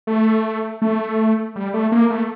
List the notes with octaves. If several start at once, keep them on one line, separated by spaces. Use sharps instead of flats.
A3
A3
G3
A3
A#3
A3